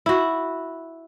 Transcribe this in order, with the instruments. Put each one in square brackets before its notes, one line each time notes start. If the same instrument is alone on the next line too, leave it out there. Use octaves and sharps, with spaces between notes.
[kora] E4 F#4